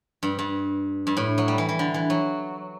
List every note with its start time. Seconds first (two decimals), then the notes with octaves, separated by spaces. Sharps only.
0.23 G2
0.39 G2
1.07 G2
1.17 A2
1.38 F#3
1.48 G3
1.58 E3
1.69 E3
1.79 D3
1.94 E3
2.10 F#3